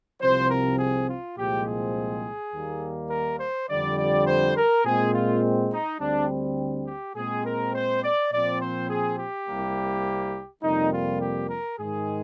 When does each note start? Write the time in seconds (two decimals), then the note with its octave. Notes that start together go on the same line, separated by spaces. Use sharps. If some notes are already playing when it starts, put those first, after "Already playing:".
0.22 C2 C3 F3 C4 C5
0.51 A#4
0.79 G#4
1.09 F4
1.37 C2 A#2 F3 G#3 C4 G4
1.67 G#4
2.53 D#2 D#3 G3 A#3
3.10 A#4
3.40 C5
3.69 F2 D3 G3 D5
3.97 D5
4.26 C5
4.56 A#4
4.85 A#2 G#3 C4 G#4
5.13 F4
5.71 D#4
6.00 D2 D3 G3 C4 D4
6.86 G4
7.15 A#2 G#3 C4 G#4
7.45 A#4
7.74 C5
8.03 D5
8.32 A#2 F3 C4 D5
8.61 C5
8.89 G#4
9.19 G4
9.47 C2 C3 G3 A#3
10.62 F2 C3 G3 A#3 D#4
10.91 F4
11.21 G4
11.50 A#4
11.78 G#2 D#3 G#3 G#4